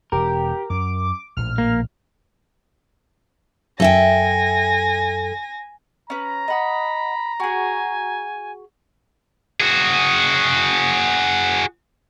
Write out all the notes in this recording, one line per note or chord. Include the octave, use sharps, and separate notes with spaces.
E1 G4 A#4
F#2 D6
A#1 A2 F3 F6
A#3
F#2 A4 E5 G5 G#5 A#6
C#4 B4 A#5
D#5 F#5 B5 D#6
F#4 G#4 G#5
F#4 G#4